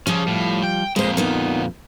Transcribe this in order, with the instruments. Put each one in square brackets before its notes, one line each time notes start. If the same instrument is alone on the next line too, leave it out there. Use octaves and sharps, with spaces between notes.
[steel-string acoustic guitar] F3 G3 F4 [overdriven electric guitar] C#4 G#4
[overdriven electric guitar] A2
G5
[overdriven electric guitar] F2 A#2 [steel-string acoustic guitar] G#3 C5
[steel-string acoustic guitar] A#3 B3 D#4